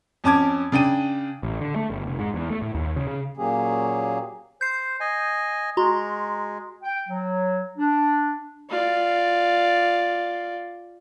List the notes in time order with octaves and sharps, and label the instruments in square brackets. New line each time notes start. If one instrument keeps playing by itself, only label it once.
[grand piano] F2 C#4 A5 D6 G#6
C#3 D4 G5 D#7
[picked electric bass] A1
D3
A3
G1
F1
G#2
E2
A3
A2
D#2
C#3
C#3
[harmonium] A#2 F#3 A#3 C#4 G4 G#4
[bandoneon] C5 [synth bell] G6 C7
[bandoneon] D#5 G#5
[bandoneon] G#3 [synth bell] F#4 A#5 C6
[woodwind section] G5
F#3
D4
[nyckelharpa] F4 D5